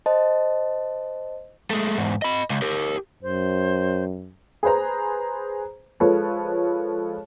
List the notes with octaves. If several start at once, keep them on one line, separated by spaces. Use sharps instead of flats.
C5 D#5 A5
G#3 A3
E2 G#2
D#5 B5
C#2
G4 A#4
F#2 C5
G#4 B4 C5 A#5
F3 G#3 A4 B4 C#5